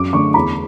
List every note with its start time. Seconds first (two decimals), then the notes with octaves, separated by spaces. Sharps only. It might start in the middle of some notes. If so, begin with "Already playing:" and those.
Already playing: F#2 D6
0.13 D3 A3 C#6
0.34 E2 B5